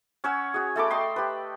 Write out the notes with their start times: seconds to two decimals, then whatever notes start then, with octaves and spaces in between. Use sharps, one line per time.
0.24 C#4 C#5 F#5 E6
0.54 F#4 G#4
0.76 A3 A4 B5 D6
0.91 D#5 G5 C6
1.16 G4 B4